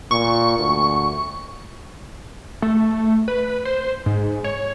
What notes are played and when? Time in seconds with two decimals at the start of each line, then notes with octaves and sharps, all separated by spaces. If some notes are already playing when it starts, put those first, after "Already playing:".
0.11 A#2 C#6
0.58 D2
2.62 A3
3.28 B4
3.65 C5
4.06 G#2
4.44 C#5